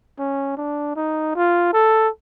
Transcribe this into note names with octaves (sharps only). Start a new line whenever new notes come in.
C#4
D4
D#4
F4
A4